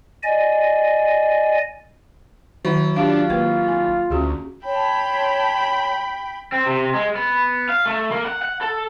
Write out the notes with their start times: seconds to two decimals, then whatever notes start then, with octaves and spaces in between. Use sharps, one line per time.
0.23 D5 D#5 G#5
2.65 D#3 F#3 E4 F#5
2.96 D4 F4 G4 F5
3.30 G#1 A#3 B4 F#5
3.68 G#5
4.10 D2 C#4 F#4 G#4
4.65 C#5 G5 A5 B5 C6
6.52 C4
6.66 C3
6.94 G#3
7.16 B3
7.69 F5
7.86 A3
8.11 A#3
8.25 F#5
8.42 F#5
8.61 A4